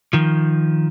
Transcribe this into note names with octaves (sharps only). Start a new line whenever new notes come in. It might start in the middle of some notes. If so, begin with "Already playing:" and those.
D#3 F3